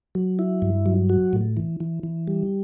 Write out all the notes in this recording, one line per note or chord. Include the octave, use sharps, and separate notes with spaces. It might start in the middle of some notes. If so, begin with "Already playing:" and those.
F#3
E4
G2
F#3
F#4
A2
E3
E3
E3
G3